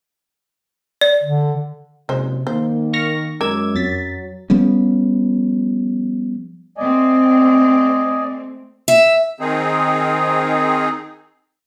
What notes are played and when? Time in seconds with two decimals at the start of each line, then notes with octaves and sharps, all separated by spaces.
1.01 D5
1.24 D3
2.09 F#1 C3 G#3 C5
2.47 D#3 A#3 C5
2.93 C#6 F6 A#6
3.41 F#2 G#3 A#4 D6 E6 G#6
3.75 F2 F#3 A6 B6
4.50 F3 G3 B3 C#4
6.77 A3 C4 D5 D#5 G#5
8.88 E5
9.40 D#3 C4 D#4 G#4